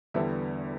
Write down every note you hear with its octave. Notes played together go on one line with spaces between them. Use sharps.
E2 D3 G3 B3 D4 E5